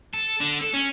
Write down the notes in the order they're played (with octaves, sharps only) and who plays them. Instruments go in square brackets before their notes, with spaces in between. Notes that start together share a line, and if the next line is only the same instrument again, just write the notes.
[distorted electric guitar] A4
D3
A4
C#4